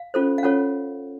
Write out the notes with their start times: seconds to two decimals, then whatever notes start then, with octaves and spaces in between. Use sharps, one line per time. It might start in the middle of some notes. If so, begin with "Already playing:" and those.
Already playing: F5
0.14 C#4 F4 A4 C5
0.38 F5
0.43 C#4 F4 A4 C#5 F#5